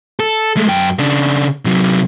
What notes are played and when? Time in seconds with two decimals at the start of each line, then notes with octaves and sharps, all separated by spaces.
0.20 A4
0.57 G#3 A3
0.68 F#2 G5
0.99 C#3 D4
1.65 C3 F#3